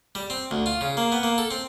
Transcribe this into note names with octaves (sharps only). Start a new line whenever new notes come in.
G3
C4
D2
F4
C#3
A#3
B3
A#3
A4
C4